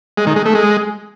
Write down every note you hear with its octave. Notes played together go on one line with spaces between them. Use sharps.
G#3
D#3
G#3
A3
G#3